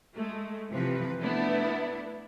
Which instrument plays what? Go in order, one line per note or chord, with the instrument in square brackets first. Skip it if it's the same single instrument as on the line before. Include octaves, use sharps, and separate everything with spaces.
[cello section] G#3 [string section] A3
[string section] C3 E3 F3 [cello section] C4 B4
[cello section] A3 D4 [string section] B3 E4